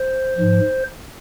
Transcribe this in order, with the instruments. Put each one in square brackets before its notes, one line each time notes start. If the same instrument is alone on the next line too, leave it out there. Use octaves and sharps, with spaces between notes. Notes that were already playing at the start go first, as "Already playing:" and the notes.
Already playing: [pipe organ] C5
G#2 F3